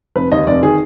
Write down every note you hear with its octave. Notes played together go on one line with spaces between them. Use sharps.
F1 B4
D#2 D#3 D#5
F1 D5
D#3 G#4